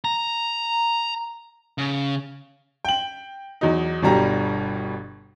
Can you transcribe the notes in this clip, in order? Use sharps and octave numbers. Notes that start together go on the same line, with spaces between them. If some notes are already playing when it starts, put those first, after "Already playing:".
A#5
C#3
G5 F#7
E2 F#3 D#4
G1 B2 G3 A#5